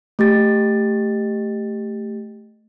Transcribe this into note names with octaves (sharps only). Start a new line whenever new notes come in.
A3 G4 A6